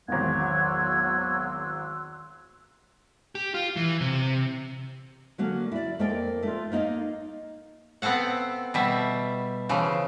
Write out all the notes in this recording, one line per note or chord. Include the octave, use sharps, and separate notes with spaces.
G#1 E2 F#3 C6 E6 F#6 G#6
G4
F4
E3
C3
D3 F#3 A#3 C#4
E4 D5
F2 A#3 D#4 A#4 D5 G5
A3 F4
A#3 D#4 D5 D#5 F5
B3 C4 A4 F5 F#5
B2 G3 E5
C#3 E3 F3